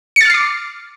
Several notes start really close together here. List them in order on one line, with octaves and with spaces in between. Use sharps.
C#7 A6 F6 C7 D6